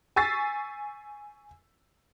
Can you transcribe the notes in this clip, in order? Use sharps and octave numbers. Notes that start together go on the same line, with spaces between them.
G#5 C#6 E6 A6 B6 C7